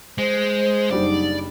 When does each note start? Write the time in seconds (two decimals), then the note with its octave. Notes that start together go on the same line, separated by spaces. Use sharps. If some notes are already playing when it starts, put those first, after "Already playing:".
0.18 G#3 C5
0.91 F#1 F#3 G3 D4 D#4 D5